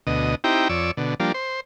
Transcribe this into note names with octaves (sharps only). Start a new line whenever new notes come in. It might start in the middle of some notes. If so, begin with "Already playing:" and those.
D2 B2 D#5
C4 D#4 E4 G4 G5 A#5
F2 C#5 D5 E6
B2 D3
F3 G3 A#3 D4
C5